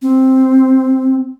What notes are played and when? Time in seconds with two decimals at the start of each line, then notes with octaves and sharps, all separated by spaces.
0.02 C4